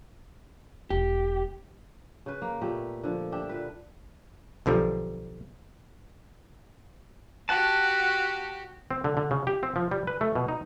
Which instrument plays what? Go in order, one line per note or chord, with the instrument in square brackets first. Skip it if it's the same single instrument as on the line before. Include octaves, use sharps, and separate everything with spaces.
[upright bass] E1 [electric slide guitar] G4
[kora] C#3 B4
A#3
A#2 A3 B3 G4
D3 F3
G3 D4 G4 E5
A#2 B4
[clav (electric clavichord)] B1 D3 F3 G3
[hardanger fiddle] F#4 G4 [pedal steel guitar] F#5 A5
[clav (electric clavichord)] C4
D3
D3
C#3
G4
C4
F3
G3
B4
A3
B2
D#4